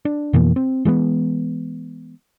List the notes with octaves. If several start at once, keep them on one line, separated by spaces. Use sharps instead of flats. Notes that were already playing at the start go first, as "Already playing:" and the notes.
D4
F2 B2 E3 A#3
C4
E3 G#3 A#3 B3